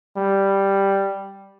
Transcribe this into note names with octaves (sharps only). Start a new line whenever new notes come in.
G3